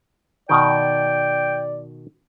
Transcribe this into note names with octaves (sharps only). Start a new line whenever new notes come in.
B2 D#3 D5 G5